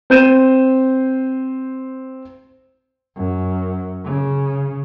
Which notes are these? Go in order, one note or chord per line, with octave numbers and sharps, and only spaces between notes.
C4 C5 G6 D#7 E7
F#2
C#3